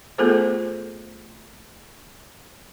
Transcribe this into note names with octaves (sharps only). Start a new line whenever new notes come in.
A3 B3 F4 G#4 A4 C5